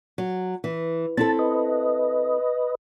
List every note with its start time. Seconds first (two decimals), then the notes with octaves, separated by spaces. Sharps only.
0.18 F#3
0.64 E3
1.17 C4 E4 A4 A5
1.39 B4 D#5